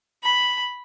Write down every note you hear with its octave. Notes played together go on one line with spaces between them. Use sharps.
B5